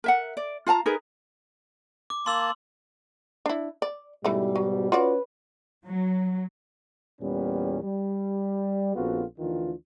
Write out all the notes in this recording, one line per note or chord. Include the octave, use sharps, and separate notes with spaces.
A#4 E5 F#5
D5
F4 F5 A5 A#5
D#4 G#4 A#4 B4
D6
A#3 A5 C6 E6 F#7
D4 E4
D5
G#2 B2 E3 G3 A3
F#3
C#4 F4 F#4 B4 D5
F#3
E2 A#2 G3 B3 C#4
G3
A#1 B3 C4 F4 F#4 A4
D2 D#3 E3 D4 F4